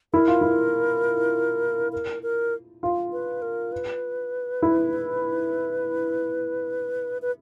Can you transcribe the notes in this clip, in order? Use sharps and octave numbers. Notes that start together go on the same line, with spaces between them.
E4 A#4
F4
E4
A#4
A#4
F4
B4
A#4
B4
E4
B4